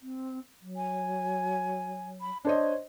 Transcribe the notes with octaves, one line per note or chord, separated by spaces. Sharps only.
C4
F#3
G#5
B5
D4 C5 C#5 D#5